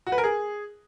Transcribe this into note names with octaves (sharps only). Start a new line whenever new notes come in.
F#4
B4
A#4
G#4